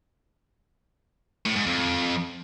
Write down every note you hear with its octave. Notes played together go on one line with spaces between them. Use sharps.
A2
G#2
F2